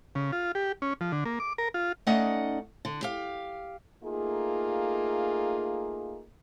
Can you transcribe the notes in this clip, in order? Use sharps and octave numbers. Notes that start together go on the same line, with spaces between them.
C#3
F4
G4
C#4
F3
D3
A#3
D6
A#4
F4
A3 C#4 D#4 D5 D#5 F#5
D3
G4 F5
A3 A#3 D#4 F4 G#4